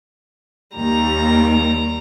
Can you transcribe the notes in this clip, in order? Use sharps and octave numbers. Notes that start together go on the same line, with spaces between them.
D#2 G3 A#5